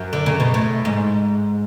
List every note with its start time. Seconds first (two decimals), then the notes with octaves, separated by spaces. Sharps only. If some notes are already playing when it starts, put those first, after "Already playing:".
Already playing: F#2
0.13 D3
0.26 C#3
0.40 B2
0.54 A2
0.85 G#2